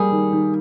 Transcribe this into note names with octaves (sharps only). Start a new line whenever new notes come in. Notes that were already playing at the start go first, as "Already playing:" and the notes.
Already playing: G3 A#3 G#4
D#3
D#3